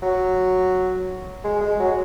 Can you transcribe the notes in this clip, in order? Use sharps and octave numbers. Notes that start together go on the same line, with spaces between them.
F#3
G#3
G#3
F#3